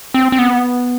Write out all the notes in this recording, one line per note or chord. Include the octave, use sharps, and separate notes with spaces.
C4
C4
B3